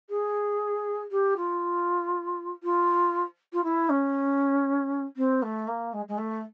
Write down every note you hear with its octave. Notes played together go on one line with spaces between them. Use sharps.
G#4
G4
F4
F4
F4
E4
C#4
C4
A3
A#3
G#3
G#3
A3